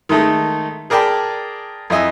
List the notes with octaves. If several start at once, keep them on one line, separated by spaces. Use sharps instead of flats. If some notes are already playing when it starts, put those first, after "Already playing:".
D#3 G#3 A3 D#4 A4
G#4 A#4 D5 G5 A5 B5
F2 E4 D#5 G#5 E6